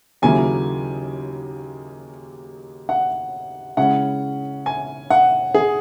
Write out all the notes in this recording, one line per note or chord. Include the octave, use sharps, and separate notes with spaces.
D#2 C#3 F#3 A#3 E4 G#5
F#5
C#3 G#3 C#4 E4 F#5
G#5
F#5
G#4